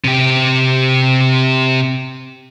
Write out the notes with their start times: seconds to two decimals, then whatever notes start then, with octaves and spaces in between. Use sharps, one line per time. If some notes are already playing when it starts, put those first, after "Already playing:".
0.04 C3 G4